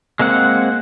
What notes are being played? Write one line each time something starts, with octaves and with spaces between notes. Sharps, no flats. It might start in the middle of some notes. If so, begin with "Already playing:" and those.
G#3 A#3 C4 F#5